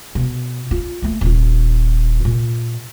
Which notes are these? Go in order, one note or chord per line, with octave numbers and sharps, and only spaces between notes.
B2
F4
A3 A#3
D#1 F4
A#2